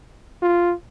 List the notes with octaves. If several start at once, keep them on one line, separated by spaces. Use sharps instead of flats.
F4